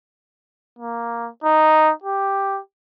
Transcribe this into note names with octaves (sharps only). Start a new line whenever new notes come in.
A#3
D#4
G4